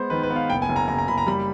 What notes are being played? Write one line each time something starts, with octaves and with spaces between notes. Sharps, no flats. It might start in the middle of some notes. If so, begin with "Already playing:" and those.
Already playing: G#3 B3 C5
D#3 B4
B4
B3
F5
F#1 G5
G#5
F#1
A#5
F#1 A#5
A#5
F#1 B5
A#5
G3 B5